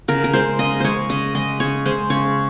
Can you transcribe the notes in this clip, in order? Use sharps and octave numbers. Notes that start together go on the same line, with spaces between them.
C#3 A#4
A#4
G#3 C5
C#3 D#5
G#3 C5 C#5
C#3 D#5
G#3 D#5
C#3 C#5
G#3 C5
C#3 C#5